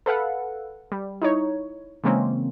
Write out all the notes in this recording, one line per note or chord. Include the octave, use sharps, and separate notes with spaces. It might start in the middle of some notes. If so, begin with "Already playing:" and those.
A4 B4 F5 F#5
G3
D#4 E4 C#5
C#3 E3 G#3 A#3 C4 C#4